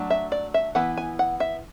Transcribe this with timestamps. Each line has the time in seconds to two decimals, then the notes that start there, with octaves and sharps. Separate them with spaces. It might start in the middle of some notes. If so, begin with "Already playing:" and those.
Already playing: F#3 A3 D4
0.10 E5
0.32 D5
0.54 E5
0.75 E3 B3 E4 F#5
0.97 G#5
1.19 F#5
1.40 E5